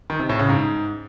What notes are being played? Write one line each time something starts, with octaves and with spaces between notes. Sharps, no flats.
D#3
C3
A2
C#3
G#2